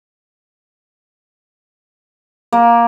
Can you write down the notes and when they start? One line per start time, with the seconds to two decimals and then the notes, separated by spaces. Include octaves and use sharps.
2.52 A#3